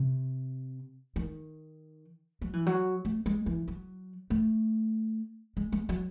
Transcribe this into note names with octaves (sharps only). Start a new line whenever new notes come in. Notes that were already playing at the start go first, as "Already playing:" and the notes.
Already playing: C3
D#3
F#3
E3
F#3
A3
G#3
E3
F#3
A3
G#3
G#3
F#3